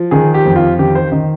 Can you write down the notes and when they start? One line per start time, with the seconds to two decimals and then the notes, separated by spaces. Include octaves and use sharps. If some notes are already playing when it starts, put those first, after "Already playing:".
Already playing: F3
0.11 D#3 G#4
0.34 G4
0.45 F2
0.56 F4
0.78 D#3 G4
0.95 C5
1.12 D#3 D#5